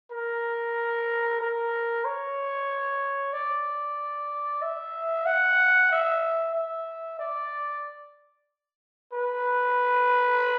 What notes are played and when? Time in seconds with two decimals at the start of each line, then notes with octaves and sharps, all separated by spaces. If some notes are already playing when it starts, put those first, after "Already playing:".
0.11 A#4
1.41 A#4
2.05 C#5
3.33 D5
4.62 E5
5.26 F#5
5.92 E5
6.55 E5
7.19 D5
9.13 B4